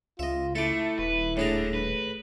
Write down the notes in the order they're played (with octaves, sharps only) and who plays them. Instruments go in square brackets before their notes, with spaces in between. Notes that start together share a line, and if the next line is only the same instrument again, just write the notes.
[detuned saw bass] C#2 [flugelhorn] F4 [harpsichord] D#5 E5
[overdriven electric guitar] A3 [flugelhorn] E4 [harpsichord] A4 D6
[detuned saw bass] D#1 [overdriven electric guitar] B4
[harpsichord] A2 G#4 A#5 [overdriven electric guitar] D3 D4
[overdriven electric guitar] B4